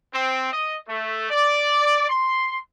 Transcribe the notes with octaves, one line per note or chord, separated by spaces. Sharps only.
C4
D#5
A3
D5
C6